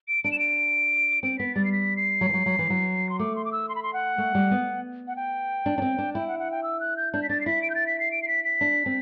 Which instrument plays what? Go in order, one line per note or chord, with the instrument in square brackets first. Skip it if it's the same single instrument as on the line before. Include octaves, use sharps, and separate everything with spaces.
[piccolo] D7
[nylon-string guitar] D4 [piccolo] D7
[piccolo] E7
D7
[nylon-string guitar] C4 [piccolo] D7
[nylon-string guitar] B3 [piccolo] B6
[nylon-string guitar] G3 [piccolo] A6
[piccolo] C7
B6
C7
[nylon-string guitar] F#3
E3
F#3
F#3
E3
F#3
[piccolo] C6
[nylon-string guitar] A3 [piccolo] D6
[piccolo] C6
D6
E6
C6
B5
C6
F#5
[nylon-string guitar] A3
G3
B3
[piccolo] F#5
G5
[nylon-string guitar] D4
D4
C4
D4
[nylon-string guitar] E4 [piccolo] G5
[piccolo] F#5
F#5
G5
E6
F#6
G6
[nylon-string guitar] D4 [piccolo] G6
[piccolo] B6
[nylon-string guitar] D4 [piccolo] A6
[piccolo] C7
[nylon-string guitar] E4 [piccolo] B6
[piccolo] D7
G6
A6
B6
C7
D7
C7
B6
B6
[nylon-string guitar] D4
C4